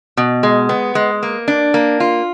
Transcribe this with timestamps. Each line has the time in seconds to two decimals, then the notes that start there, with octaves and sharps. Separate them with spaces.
0.17 B2
0.43 G#3
0.69 B3
0.95 G#3
1.23 A#3
1.48 D4
1.74 A#3
2.00 F4